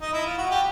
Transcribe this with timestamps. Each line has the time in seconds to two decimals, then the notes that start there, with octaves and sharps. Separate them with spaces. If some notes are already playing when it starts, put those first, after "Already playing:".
0.01 D#4
0.13 E4
0.26 F4
0.38 F#4
0.50 G4